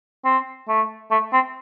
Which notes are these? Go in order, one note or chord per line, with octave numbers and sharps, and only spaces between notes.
C4
A3
A3
C4